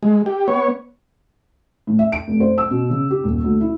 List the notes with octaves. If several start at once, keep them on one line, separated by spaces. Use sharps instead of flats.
G#3
G4
B3 C#5
A2
E5
D7
F1
C5
E6
B2
C#3
G4
D#1
D2
E4